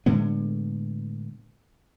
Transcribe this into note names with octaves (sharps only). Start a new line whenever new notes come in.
A2 D3 G#3 B3